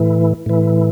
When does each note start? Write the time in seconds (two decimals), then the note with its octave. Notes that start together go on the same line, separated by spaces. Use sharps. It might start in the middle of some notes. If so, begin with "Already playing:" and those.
Already playing: A2 E3
0.46 A2 E3